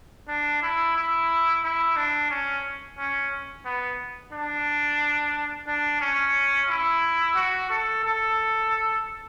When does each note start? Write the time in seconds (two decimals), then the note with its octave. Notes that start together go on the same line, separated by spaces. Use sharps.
0.28 D4
0.62 E4
0.96 E4
1.63 E4
1.96 D4
2.30 C#4
2.98 C#4
3.65 B3
4.32 D4
5.67 D4
6.01 C#4
6.69 E4
7.36 F#4
7.70 A4
8.04 A4